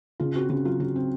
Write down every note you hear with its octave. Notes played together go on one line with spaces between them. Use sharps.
C#3 F4
C4 F#4
C#3 F#4
F#3 F4
C#3 F#4
C4